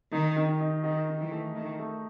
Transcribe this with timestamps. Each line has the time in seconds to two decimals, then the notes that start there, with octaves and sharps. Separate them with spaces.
0.12 D#3 D#4
0.36 D#3
0.60 D#4
0.84 D#3 D#4
1.08 D#3
1.20 E3
1.31 A3
1.55 D#3 A3
1.79 A3